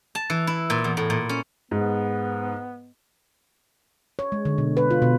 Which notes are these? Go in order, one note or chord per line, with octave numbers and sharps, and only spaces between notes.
A5
E3
E4
A#2
E2
A2
A#2
C#4
G#2 B3
C#5
G#3
D3
B2
B4
F4
B2